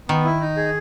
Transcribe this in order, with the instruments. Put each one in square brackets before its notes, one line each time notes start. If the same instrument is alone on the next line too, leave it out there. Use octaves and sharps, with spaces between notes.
[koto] D#3 [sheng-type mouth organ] B3
[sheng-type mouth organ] E4
D#4
G#4